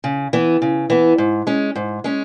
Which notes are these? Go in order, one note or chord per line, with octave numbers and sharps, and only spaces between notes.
C#3
E3 B3
C#3
E3 B3
G#2
G#3 C#4
G#2
G#3 C#4